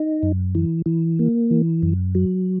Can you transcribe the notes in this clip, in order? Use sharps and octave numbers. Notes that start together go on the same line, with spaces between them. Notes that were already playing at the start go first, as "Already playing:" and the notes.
Already playing: D#4
F#2
E3
E3
A#3
E3
F#2
F#3